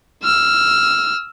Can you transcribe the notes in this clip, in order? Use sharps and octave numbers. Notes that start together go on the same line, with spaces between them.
E6 F6